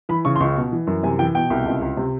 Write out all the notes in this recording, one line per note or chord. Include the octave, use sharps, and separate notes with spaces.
E3 B5
C#3 C#6
C6
C#2 C#6
B2
E3
F#2
C3 G#5
E3 G5
B2 G5
C2
C#2
C#2
C3